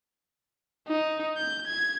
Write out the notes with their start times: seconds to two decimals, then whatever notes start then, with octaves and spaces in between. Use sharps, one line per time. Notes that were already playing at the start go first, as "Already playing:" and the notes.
0.88 D#4
1.37 G6
1.67 G#6